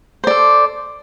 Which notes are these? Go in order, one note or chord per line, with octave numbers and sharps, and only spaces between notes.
A4 C5 D5